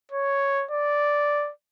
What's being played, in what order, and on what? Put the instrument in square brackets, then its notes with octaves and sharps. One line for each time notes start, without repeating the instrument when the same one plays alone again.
[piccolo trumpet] C#5
D5